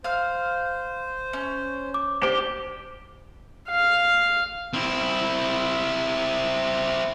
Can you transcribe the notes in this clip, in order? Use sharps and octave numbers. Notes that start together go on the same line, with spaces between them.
C5 F5 F6
C#4
D6
D4 G4 C5
F5
C4 E4